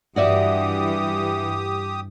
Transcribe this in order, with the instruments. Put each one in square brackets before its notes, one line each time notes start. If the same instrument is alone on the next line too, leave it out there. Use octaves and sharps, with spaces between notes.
[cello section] G2 E3 [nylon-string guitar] F#4 D5 E5 [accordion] G4 D#6